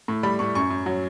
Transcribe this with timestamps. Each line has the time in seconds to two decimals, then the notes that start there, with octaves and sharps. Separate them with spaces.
0.08 A2
0.23 G3 B5
0.39 A2 C#6
0.55 F#2 C#6
0.70 F#2
0.86 F#3